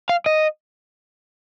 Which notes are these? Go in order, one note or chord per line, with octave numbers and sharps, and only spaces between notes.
F5
D#5